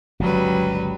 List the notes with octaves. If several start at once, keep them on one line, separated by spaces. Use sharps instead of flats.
G1 C#2 F#3 G3 B4